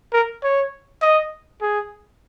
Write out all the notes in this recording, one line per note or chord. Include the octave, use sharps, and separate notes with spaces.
A#4
C#5
D#5
G#4